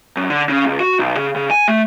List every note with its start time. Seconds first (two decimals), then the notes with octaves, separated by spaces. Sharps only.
0.17 F#2
0.30 D3
0.49 C#3
0.64 C#2
0.80 F#4
0.99 B1
1.17 C#3
1.36 C#3
1.51 G#5
1.68 A3